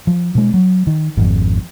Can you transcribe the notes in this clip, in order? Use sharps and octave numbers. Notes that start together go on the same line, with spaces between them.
F3
B2 G#3
F#3
D#3
G#1 F2